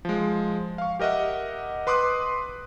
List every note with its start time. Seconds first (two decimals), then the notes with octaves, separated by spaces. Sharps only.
0.05 F3 G#3
0.78 F5 C#6
0.99 G4 A#4 D#5 E5 F#5
1.87 B4 C6 D6 D#6 F#6